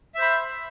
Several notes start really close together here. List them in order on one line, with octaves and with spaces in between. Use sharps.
E5 C5 B5